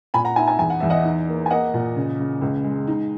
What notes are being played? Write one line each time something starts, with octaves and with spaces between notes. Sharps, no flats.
A#2 G#5 B5
F#5 A#5
D#4 E5 G#5
E5 G#5
E2 G#5
F#5
E2 E5
D#5 F#5
D#4
A#3
G#5
A#3 D#5 F#5
A#2
C#3
C#3
C#2
G#3
D#4